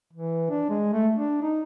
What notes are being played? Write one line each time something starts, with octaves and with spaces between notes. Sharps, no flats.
E3
D4
G#3
A3
D4
D#4